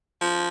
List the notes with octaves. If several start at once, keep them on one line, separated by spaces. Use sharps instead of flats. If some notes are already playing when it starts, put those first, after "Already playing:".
F3